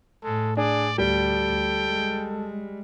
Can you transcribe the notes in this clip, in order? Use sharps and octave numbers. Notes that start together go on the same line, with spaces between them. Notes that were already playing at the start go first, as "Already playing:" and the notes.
A2 G#3 A4
D4 G#4 D5
D2 G3 A4 G5
G#3